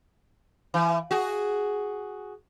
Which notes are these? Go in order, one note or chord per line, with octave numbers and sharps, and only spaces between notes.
E3
F#4 G#4